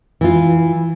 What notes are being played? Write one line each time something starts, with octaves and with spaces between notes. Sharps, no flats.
E3 F4